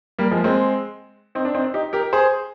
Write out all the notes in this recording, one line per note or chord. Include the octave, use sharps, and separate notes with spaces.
G3 A#3
F3 G#3
A#3
G#3 C4
C4 D#4
D4
C4 D#4
D#4 G4
G4 A#4
G#4 C5